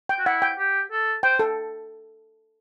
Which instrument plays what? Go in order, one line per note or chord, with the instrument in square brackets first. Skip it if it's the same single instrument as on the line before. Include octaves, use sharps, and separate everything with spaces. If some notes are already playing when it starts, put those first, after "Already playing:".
[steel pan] G5
[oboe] F#4
[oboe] E4 [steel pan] F#5
[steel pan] G5
[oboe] G4
A4
[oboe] C5 [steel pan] G5
[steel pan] A4